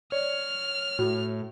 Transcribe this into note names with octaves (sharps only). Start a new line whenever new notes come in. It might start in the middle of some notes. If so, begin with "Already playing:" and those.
C#5 D5 F6
A2 F#4